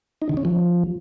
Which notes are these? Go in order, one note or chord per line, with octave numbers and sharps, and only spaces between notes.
D#4
D3
C#4
F3